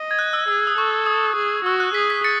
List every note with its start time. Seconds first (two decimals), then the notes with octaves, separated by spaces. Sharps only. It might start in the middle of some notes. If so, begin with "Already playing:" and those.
Already playing: D#5
0.11 G#6
0.19 F#6
0.33 E6
0.48 G#4 E6
0.67 D#6
0.78 A4 C#6
1.06 D#6
1.37 G#4
1.65 F#4 E6
1.80 F#6
1.95 G#4 B6
2.10 B6
2.24 A6 C#7